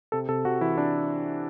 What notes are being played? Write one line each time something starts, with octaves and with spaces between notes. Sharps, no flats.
C3 A4
C3 A4
C3 F#4
E3 E4
D4